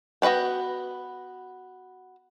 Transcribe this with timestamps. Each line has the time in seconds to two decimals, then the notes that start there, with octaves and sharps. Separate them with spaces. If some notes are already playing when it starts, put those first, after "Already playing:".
0.22 B3 F#4 B4 D5 G5